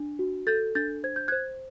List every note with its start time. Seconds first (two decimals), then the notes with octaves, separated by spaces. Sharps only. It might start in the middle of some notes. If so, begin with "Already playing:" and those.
Already playing: D4
0.19 F#4
0.47 A4 G6 A6
0.75 D4 G6 A6
1.04 C5 G#6
1.16 G6
1.28 C5 F#6 G#6